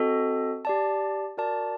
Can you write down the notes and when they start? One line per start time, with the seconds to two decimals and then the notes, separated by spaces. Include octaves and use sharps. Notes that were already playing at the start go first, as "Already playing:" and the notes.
Already playing: C4 F#4 A4 D#5
0.65 G4 D5 A5
1.38 F#4 A#4 D5 A5